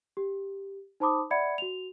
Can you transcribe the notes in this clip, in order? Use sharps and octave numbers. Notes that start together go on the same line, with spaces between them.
G4
D#4 C5 A5 B5 D6 D#6
D5 E5 F#5 B5 G#6 C#7
F#4 F7